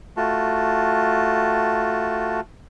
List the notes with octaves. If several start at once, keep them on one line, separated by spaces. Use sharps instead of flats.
A3 F4 F#4 A5